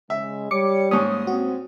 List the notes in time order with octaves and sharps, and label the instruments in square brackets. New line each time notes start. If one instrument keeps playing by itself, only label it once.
[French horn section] C#3 G#3 [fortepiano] E5
[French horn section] G3 [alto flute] C#5 [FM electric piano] D6 C#7
[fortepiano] G#2 C#4 [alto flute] A#3 [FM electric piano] D#6
[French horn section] C4 [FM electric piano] F#4